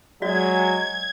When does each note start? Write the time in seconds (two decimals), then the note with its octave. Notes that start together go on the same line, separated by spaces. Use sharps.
0.22 F#3 G#3 F#4 D5 G#6